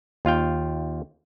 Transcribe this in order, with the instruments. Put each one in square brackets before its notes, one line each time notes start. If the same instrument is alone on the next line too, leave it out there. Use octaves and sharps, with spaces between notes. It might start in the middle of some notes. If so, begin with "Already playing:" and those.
[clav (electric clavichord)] D#2 F4 F5 G5